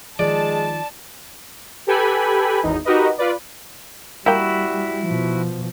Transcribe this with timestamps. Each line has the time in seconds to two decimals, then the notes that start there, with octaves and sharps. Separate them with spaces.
0.19 D#3 F3 G#3 D5 A5
1.87 G4 A4 B4 G5 G#5 B5
2.63 G#1 E2 D#4
2.85 D#4 F#4 G4 A#4 B4 D#5
3.18 F4 B4 D5
4.26 G3 A#3 E4 F#4 A#4 G5
5.07 B2 F3